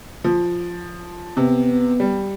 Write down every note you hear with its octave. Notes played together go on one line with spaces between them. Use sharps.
F3
C3 B3
G3